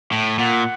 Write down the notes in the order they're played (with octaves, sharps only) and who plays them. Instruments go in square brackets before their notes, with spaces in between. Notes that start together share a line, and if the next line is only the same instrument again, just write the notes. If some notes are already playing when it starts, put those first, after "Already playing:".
[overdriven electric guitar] A2
[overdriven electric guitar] A#2 [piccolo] F#5